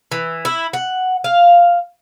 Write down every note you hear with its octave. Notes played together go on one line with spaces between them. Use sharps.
E3
E4
F#5
F5